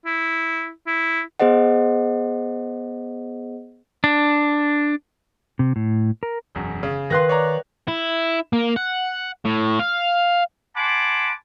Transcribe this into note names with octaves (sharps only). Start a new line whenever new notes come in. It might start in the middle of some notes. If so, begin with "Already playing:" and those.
E4
E4
B3 G#4 C5 D#5 F#5
D4
C3
A2
A#4
E1 F#2
C#3
D#3 B4 F5 C6 F#6 A#6
C#5 D5 A#5
E4
A#3
F#5
A2
F5
F#5 G#5 A5 B5 C6 D6